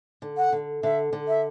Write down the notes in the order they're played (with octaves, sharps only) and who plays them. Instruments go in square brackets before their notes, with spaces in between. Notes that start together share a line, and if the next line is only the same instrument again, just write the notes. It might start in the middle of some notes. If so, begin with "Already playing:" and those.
[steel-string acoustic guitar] D3
[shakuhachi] F#5
[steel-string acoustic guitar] D3
[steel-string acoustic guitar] D3 [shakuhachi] E5
[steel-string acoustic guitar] D3
[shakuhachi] E5